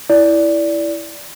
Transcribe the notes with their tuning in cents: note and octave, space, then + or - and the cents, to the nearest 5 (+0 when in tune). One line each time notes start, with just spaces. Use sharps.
E4 +0 D5 -15